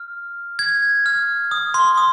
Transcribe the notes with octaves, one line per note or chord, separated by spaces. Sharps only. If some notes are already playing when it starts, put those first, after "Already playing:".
Already playing: F6
G#6
F6
D#6
C6
D#6